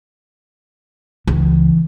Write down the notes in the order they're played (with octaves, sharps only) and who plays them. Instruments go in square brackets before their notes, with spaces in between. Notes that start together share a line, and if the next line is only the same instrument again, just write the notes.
[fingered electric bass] C#2 [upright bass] E3